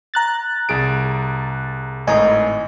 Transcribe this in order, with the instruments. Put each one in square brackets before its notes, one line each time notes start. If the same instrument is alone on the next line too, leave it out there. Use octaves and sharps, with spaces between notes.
[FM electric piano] A#5 F#6 A6
[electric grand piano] C2 G#4 D7
[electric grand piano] G#1 A2 A#5 [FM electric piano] D#5 G#5